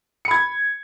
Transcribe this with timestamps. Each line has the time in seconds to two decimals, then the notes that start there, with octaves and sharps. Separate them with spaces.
0.25 C#7
0.28 B5
0.31 G#6